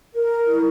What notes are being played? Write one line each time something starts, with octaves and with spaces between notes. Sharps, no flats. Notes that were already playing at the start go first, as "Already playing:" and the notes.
A#4
E4